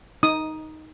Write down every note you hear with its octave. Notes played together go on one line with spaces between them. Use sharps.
D#4 D#6